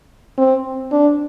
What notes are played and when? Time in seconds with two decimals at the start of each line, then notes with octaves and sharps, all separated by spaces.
0.38 C4
0.92 D4